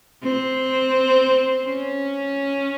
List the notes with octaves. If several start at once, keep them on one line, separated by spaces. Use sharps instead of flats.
C4
C#4